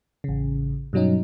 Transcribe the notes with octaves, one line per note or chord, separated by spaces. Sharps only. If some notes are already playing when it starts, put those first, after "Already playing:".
A1 C#3
G2 B2 F#3 C#4 D#4